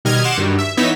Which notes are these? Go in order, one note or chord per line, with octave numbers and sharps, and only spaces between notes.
B2 D#3 G3 D#5 F6 G#6
F#5 C6 D6 E7
G2 D#3 F#3 G3
E5
E3 B3 D#4 C#5 E5 B6